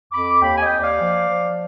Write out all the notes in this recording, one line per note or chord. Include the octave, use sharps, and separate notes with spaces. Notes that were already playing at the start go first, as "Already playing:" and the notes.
F2 B5 D6
D#2 G5 B5
G#5
D#5 G5
D#2
D5 F5
F3
F3